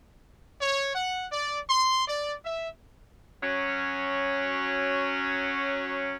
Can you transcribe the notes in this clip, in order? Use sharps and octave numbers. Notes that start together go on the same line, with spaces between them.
C#5
F#5
D5
C6
D5
E5
F#3 C#4